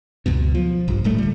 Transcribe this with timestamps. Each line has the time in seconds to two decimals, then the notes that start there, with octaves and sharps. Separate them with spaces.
0.26 C#2 F#2 B2
0.55 F3
0.88 A#1 G2
1.04 D1 A2 G3 A3
1.18 D3 G3